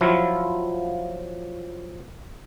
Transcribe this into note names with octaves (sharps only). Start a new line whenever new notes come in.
F3 F#3 E4 F4